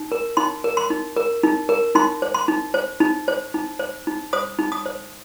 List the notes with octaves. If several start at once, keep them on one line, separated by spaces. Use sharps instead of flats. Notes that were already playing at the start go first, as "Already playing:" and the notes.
Already playing: D#4
A#4
D#4 C6
A#4
C6
D#4
A#4
D#4
A#4
D#4 C6
C5
C6
D#4
C5
D#4
C5
D#4
C5
D#4
C5 D#6
D#4
D#6
C5